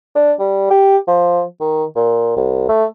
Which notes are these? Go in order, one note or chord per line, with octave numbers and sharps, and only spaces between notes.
D4
G3
G4
F3
D#3
A#2
C2
A3